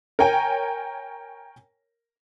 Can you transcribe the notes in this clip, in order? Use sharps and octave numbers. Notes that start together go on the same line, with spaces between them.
A#4 C#5 G5 G#5